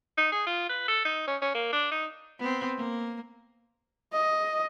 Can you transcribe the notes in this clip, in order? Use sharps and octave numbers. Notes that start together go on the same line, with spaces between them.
D#4
G#4
F4
B4
A4
D#4
C#4
C#4
A#3
D4
D#4
B3 C4
A#3
D#5